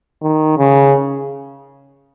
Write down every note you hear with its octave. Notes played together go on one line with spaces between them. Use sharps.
D#3
C#3